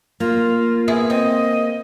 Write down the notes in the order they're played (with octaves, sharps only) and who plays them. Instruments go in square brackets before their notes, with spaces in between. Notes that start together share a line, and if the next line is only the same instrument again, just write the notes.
[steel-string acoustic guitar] A#3 [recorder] F4
[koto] B3 E4 G#4
[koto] C4 [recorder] D#5